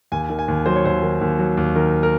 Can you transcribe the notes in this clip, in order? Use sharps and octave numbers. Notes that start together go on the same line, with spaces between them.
D#2 G#5
D#3
G#5
D#2
F#3 C5
C#5
D#2 C5
D#3
D#2
F#3
D#2
D#3 A#4
A#4